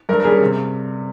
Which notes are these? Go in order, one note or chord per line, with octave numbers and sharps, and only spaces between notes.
G2 A#4
A#4
G3 C#4 G#4
C3